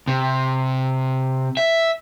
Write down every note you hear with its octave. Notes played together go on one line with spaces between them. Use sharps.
C3
E5